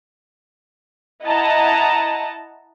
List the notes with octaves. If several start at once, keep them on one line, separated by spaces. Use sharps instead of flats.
E4 D#5 F#5 A5 A#5